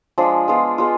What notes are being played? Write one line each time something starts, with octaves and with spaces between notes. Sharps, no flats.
F3 G#3 D4 G#4
G#3 B3 F4
G#3 B3 F4